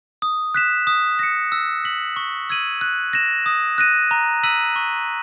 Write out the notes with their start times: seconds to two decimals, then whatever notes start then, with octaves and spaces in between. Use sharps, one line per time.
0.22 D#6
0.55 F#6 B6 E7
0.87 D#6
1.19 A#6 C#7
1.52 E6
1.84 B6 F#7
2.16 C#6
2.50 E6 G#6 D#7 F#7
2.81 F#6
3.13 A#6 E7
3.46 D#6
3.78 F#6 A#6 D#7
4.11 A#5
4.43 E6 B6 D#7 F#7
4.76 C#6